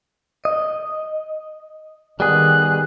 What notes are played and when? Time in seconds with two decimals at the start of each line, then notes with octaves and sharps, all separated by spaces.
0.45 D#5
2.20 D#3 G3 B3 G#4 F#6